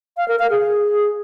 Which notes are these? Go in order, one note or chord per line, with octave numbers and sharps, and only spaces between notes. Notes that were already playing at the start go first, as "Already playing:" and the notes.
F5
A#4
F5
G#4